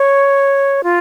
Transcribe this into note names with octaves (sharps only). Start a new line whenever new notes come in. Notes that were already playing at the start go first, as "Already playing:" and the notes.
Already playing: C#5
F4